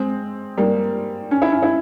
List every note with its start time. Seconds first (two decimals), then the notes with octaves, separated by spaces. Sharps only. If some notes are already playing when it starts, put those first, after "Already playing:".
Already playing: G#3 C4
0.57 G3 A#3
1.31 C#4
1.42 E4
1.52 C#4
1.63 E4